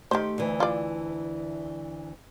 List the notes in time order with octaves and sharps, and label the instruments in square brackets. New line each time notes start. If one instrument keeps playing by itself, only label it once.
[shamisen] D#3 C5 [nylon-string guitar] A3 G4
[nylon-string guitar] D2 E3
[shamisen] F4 D5